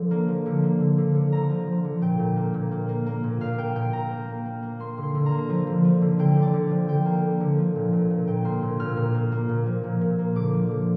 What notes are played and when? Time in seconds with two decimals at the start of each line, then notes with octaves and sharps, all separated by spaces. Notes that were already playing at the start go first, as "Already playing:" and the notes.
Already playing: D3 F3
0.11 A#3
0.28 F3
0.46 D3
0.63 A#3
0.80 D3
0.98 D3
1.15 D3
1.32 D3 A#5
1.50 F3
1.67 F3
1.85 D3
2.01 A#2 G5
2.19 A#2
2.36 A#3
2.54 A#2
2.71 A#3
2.89 A#3
3.06 A#3
3.24 A#2
3.40 A#2 F5
3.58 A#3 G5
3.75 A#2 G5
3.93 A#2 A#5
4.11 A#3
4.28 A#3
4.45 A#3
4.62 A#3
4.80 A#3 C6
4.97 D3
5.03 C6
5.15 D3
5.26 A#5
5.32 A#3
5.49 F3
5.67 D3
5.84 F3
6.02 D3
6.19 D3 G5
6.36 D3
6.42 D5
6.53 D3
6.71 F3
6.88 D3 G5
7.05 A#3
7.23 A#3
7.40 D3
7.58 F3
7.75 A#2
7.93 A#2
8.10 A#2
8.27 A#2 G5
8.45 A#3 C6
8.62 A#2
8.80 A#2 F6
8.97 A#2
9.14 A#3
9.32 A#3
9.49 A#2
9.66 F3
9.84 A#2
10.01 A#2
10.19 A#3
10.36 D3 D6
10.53 F3
10.71 D3